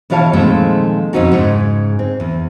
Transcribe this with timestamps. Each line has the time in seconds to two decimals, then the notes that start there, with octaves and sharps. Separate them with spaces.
0.10 B2 E3 F4 C#5 F5 A5
0.33 A#2 D#3 F3 G#3 A3 C4
1.13 F2 B2 C4 C#4 D#4 F#4
1.31 G#2 C#3
1.99 C4
2.20 E2